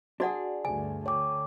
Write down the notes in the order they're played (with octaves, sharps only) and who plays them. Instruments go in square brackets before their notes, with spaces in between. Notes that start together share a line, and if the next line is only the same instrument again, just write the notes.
[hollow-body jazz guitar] D4 G#4 [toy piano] F#4 D5 F#5
[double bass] D2 G2 [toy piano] G#5
[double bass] D3 [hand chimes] C#5 G5 D6